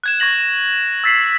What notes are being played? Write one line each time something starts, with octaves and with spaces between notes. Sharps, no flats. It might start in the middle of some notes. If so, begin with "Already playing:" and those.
F#6 G#6 E7
C#6 G#6 A#6 F#7
E6 A6 B6 C7